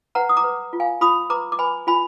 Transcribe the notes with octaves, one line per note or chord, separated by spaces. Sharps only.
B4 F#5 A#5
D#6
A#5 D6
B4
F4
F5 G#5
F4 B5 D#6
B4 A#5 D6
D6
B4 G#5 B5
F4 G#5 B5